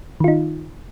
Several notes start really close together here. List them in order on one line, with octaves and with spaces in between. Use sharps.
D#3 F4 D#4